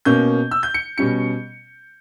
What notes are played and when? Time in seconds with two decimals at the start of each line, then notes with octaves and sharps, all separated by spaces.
0.05 B2 A#3 C#4 G6
0.51 E6
0.63 G6
0.74 C#7
0.98 B2 G3 C#4 C#7